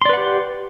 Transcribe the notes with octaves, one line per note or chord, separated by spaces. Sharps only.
G4 B4 D5 F#5 C6